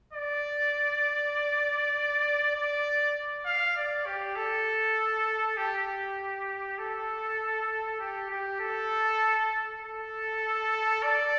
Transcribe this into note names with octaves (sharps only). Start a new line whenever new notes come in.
D5
D5
F5
D5
G4
A4
G4
A4
G4
G4
A4
A4
D5